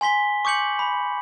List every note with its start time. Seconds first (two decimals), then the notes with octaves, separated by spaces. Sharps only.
0.01 G#5 C6 B6 G7
0.45 C#6 D6 G6 C#7 F#7
0.79 B5